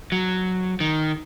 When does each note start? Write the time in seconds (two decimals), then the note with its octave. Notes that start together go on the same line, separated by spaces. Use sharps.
0.12 F#3
0.80 D#3